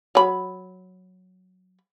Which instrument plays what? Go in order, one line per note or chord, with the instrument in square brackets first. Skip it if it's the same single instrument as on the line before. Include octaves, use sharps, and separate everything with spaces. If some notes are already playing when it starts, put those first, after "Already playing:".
[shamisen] F#3 B5